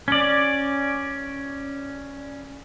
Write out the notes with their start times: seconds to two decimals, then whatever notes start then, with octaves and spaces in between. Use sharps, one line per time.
0.08 C#4 D5